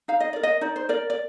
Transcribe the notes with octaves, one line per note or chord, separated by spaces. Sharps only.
D#4 F5
D#5
A#4 D5
D#5
D#4 D5
C5
A#4 D5
D5